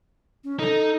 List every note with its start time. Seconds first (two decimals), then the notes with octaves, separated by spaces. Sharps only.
0.44 C#4
0.59 D#4 A4